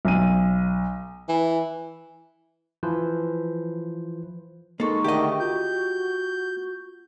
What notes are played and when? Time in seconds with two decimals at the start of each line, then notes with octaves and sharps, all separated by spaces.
0.05 B1 D#7
1.29 E3
2.83 E3 F3 B4 C5
4.80 G#3 A#3 D#4 G#4 A4 C#6
5.04 D3 D#3 A3 G4 D#5
5.40 F4 F#4 G6